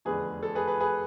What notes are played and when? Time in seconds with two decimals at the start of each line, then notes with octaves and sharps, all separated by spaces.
0.05 F1 E2 D3 G#4 B4
0.43 A4
0.55 G#4 B4
0.68 G#4 B4
0.80 G#4 B4